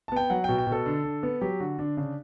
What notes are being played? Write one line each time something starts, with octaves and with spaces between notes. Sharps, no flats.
A5
B3 G5
F#3 F#5
B2 G5
G5
B2
A4
D3
D3
B3
F#3 G4
D3 F#4
D3 D4
C#3 D4